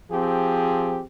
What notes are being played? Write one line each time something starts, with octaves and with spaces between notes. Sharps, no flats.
F3 C4 G4 G#4